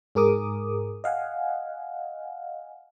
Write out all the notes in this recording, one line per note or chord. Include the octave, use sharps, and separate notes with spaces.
G#2 G#4 A#4 D6 D#6
D#5 F5 F#5 G#5